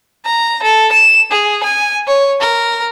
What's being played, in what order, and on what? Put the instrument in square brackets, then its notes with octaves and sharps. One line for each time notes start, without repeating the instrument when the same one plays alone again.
[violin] A#5
A4
E7
G#4
G#5
C#5
A#4